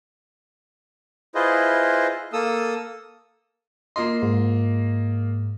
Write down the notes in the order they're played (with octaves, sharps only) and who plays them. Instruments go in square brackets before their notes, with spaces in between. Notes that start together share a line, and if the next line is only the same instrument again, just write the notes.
[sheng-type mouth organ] E4 F4 G#4 B4 C5 D#5
A#3 A4 D#6 E6
[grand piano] A#3 F4 D#5 [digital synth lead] C6
[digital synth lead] G#2